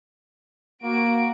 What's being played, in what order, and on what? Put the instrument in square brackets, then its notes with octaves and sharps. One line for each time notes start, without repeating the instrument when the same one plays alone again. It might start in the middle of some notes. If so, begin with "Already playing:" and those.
[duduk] A#3 [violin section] F#4 D7